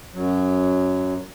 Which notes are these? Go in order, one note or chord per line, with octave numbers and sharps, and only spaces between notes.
F#2 F#3